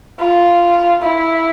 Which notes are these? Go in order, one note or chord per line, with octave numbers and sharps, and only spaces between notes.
F4
E4